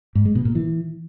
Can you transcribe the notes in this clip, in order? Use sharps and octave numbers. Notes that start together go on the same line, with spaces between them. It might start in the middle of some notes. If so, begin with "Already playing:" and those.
G#2
G#3
B2
A#2
E3